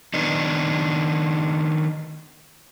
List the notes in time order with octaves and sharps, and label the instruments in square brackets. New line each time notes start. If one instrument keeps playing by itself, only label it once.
[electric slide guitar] D#3 B3 D4 D#4